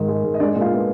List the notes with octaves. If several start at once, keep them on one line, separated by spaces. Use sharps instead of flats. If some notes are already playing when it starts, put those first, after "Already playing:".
Already playing: G#2 D#3
G#3
G#2
D#5
G#3 D4 D5
A#2
F4 F5
B3